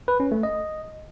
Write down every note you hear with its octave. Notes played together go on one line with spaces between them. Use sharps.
B4
C#4
A3
D#5